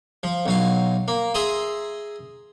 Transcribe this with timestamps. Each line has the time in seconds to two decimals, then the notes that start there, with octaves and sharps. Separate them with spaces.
0.23 F3
0.46 B1 F#3 F5
1.08 A#3
1.34 G#4 E5 A#5 C6 D#6